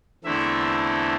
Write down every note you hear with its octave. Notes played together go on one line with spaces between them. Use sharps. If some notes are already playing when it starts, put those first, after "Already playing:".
E2 D3 A3 C4 E4 E5